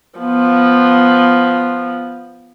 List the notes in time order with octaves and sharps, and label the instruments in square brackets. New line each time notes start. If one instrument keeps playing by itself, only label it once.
[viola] F3 B3